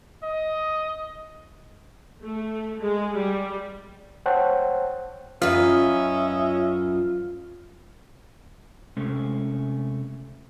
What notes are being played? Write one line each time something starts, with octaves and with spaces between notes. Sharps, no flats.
D#5
A3
G#3
G3
C5 C#5 F#5 G5 A5
F#2 C#4 F4 B4 D#5 E5
C3 G#3 A3 C#4